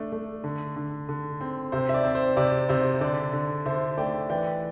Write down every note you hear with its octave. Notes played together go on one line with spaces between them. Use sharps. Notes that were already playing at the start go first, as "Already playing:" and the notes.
Already playing: A3 D4
A3
D3
D3
D3
C4
C3 C5
E5
D5
C4
C5
C3 D5
C3 C5
D3 D5
D3
D3 C5 E5
A3 D5 G5
E3 D5 G5